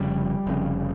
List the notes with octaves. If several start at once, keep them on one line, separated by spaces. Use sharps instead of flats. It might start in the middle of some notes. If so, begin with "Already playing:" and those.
Already playing: F1 F2 C#3 G3
F1 F2 C#3